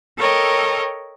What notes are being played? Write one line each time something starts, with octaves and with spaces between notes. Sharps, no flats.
A4 A#4 C#5 D#5 G5